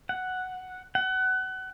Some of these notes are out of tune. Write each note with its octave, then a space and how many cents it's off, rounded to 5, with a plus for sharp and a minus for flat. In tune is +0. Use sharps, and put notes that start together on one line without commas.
F#5 +0
F#5 +25